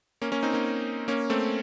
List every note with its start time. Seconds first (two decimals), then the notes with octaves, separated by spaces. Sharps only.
0.22 A#3 C#4
0.32 A#3 C#4
0.43 C4 D#4
0.53 A#3 C#4
1.08 A#3 C#4
1.30 A3 C4